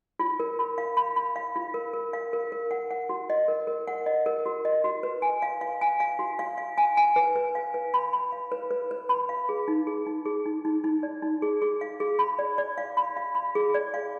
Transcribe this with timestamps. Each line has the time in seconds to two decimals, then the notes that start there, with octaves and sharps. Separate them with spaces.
0.19 F4
0.40 A#4
0.59 B5
0.78 F5
0.97 B5
1.16 B5
1.36 F5
1.56 F4
1.74 A#4
1.94 A#4
2.13 F5
2.33 A#4
2.52 A#4
2.71 F#5
2.91 F#5
3.09 F#4
3.30 D#5
3.48 A#4
3.67 A#4
3.87 F#5
4.06 D#5
4.26 A#4
4.46 F#4
4.65 D#5
4.84 F#4
5.03 B4
5.22 G#5
5.42 F5
5.61 F5
5.81 G#5
6.00 F5
6.19 F#4
6.39 F5
6.58 F5
6.78 G#5
6.97 G#5
7.16 B4
7.36 B4
7.55 F5
7.74 B4
7.94 B5
8.13 B5
8.32 F5
8.52 B4
8.71 B4
8.91 B4
9.09 B5
9.29 F5
9.49 G#4
9.68 D#4
9.87 G#4
10.06 D#4
10.25 G#4
10.45 D#4
10.65 D#4
10.84 D#4
11.03 D5
11.22 D#4
11.42 G#4
11.62 G#4
11.81 F5
12.00 G#4
12.19 B5
12.39 D5
12.58 D5
12.78 F5
12.97 B5
13.17 F5
13.35 B5
13.55 G#4
13.74 D5
13.94 F5